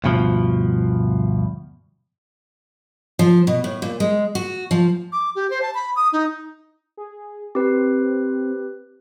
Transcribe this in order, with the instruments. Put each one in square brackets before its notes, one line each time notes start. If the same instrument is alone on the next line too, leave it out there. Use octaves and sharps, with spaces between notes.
[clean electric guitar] D2 G2 B2 F3
[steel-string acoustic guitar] F3
B2
A2
A#2
G#3
F#4
F3
[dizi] D6
G4
C5
A5
B5
D#6
D#4
[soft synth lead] G#4
[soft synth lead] C4 [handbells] G4 B4